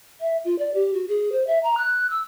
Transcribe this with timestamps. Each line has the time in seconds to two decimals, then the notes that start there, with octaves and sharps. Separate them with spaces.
0.20 E5
0.45 F4
0.59 D5
0.74 G4
0.94 F#4
1.08 G#4
1.32 C5
1.47 E5
1.63 A#5
1.78 F#6
2.10 E6